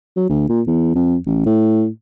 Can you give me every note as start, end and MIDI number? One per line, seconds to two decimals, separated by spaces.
0.17 0.26 54
0.30 0.44 38
0.49 0.61 46
0.67 0.91 40
0.95 1.16 41
1.26 1.41 33
1.46 1.87 45